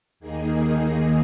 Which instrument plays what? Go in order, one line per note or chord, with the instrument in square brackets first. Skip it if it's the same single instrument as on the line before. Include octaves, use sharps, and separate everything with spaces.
[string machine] D#2 D#3 A#3 D#4 G#4